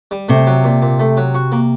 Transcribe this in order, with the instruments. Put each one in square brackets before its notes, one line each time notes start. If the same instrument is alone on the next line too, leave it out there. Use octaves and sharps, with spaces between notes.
[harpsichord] G3
[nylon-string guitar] C3 [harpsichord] A3
[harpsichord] F#3
A#2
A#2
A3
F#3
F#4
A#3